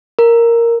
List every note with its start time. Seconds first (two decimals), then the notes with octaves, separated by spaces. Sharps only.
0.19 A#4